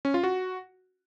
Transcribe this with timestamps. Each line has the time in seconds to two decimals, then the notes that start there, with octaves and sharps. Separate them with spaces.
0.05 C#4
0.14 F4
0.24 F#4